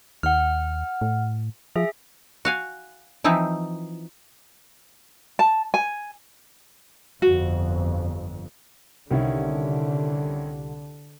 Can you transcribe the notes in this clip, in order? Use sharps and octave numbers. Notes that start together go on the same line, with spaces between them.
D#2 F#5 F6
A2
F3 G#4 E5
F#4 F5 G#5
E3 F3 C4 D#4 E4
A5
G#5
G1 F2 F#4
C2 D3 D#3 C#4 E4